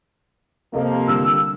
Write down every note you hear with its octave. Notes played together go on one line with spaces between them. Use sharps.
C3 F3 A#3 A4 D#5
D3 G3 E6 F6